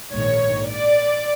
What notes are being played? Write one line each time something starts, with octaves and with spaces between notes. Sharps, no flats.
A#1 G#2 D#3 C#5
D5